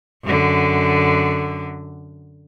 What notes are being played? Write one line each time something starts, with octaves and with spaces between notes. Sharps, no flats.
F#2 D3